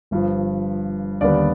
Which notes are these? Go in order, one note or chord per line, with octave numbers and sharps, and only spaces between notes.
G1 G2 F3
D#2 D3 G3 B3 D5